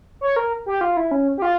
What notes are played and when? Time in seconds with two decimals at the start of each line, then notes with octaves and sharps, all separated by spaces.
0.21 C#5
0.36 A#4
0.66 G4
0.81 F4
0.97 E4
1.11 C#4
1.38 G4
1.42 F4